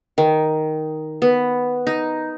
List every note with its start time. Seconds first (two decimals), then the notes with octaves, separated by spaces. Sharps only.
0.18 D#3
1.22 B3
1.87 D#4